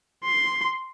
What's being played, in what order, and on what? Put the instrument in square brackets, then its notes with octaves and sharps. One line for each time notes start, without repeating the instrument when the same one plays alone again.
[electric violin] C6